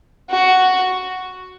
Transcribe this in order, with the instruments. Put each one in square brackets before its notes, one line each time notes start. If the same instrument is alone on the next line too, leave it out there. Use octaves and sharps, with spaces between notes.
[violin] F#4